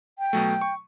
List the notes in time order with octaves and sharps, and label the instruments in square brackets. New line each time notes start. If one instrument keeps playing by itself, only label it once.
[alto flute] G5
[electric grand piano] B2 F#3 A3
C#6